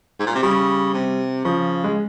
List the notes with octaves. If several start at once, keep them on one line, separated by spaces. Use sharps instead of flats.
G#2
A#2
C3
C#3 G3
C3
C#3 F3
G#3